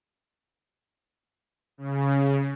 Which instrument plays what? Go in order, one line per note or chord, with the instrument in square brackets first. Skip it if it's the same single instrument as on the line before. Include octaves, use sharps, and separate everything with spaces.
[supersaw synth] C#3